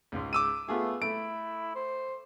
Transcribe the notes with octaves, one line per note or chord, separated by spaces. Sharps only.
C#2 G#2
D6 E6 D#7
A3 B3 F4 G#4
A3 E4 D7
C5